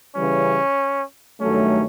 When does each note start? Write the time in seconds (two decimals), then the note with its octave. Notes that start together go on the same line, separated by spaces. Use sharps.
0.15 C#3 E3 G3 C#4
1.41 G2 D#3 F#3 A3 C#4